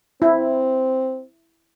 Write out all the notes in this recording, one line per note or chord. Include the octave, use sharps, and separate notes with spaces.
C4 E4